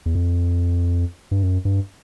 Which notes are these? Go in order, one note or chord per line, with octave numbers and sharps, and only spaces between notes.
E2
F2
G2
F#2
G2